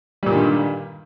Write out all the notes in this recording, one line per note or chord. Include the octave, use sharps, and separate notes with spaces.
G2 A#2 D3 D#3 G3